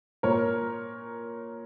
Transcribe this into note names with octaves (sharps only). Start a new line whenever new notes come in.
A#2 A#4 C#5